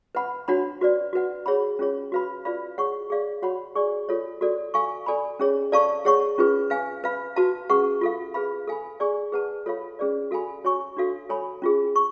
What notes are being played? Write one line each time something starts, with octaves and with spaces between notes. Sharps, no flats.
B4 F#5 B5
D4 F#4 C#5 F#5 B5
F#4 B4 D5
F#4 B4 F#5
G#4 C#5 F#5 B5
C#4 F4 G#4 C#5
F#4 B4 F5 B5
F4 B4 D5 F5 B5
G#4 C#5 F#5 C#6
G#4 D5 F5
F#4 C#5 F#5 B5
G#4 D5 G#5 C#6
F4 A4 C#5
F#4 A4 D5
A4 F5 G#5 C#6
A4 D5 G#5 B5
C#4 G#4 C#5
A4 D5 F5 A5 C#6
G#4 C#5 F#5 C#6
C#4 F4 G#4 B4
B4 F5 G#5
B4 F5 B5
F#4 B4 F5 A5
C#4 G#4 B4 F#5 C#6
F4 A4 F5
G#4 B4 F5 B5
A4 F5 G#5 B5
G#4 D5 G#5 C#6
G#4 B4 F#5 A5
F4 A4 C#5 F5 B5
C#4 G#4 B4 D5
F#4 A4 F5 G#5 B5
F#4 C#5 G#5 C#6
D4 F#4 A4 F5
A4 C#5 G#5 B5
C#4 F4 G#4
C#6